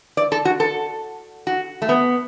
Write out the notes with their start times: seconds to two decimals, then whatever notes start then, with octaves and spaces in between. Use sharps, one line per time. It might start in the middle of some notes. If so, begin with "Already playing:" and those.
0.17 D5
0.32 A4
0.45 F#4
0.60 A4
1.47 F#4
1.82 A3
1.89 B3